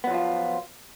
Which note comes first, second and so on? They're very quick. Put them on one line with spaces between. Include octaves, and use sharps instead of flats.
B3 F#3 F3 F4